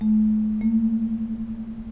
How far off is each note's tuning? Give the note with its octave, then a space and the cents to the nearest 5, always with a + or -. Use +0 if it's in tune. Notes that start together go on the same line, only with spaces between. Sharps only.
A3 -40
A3 +45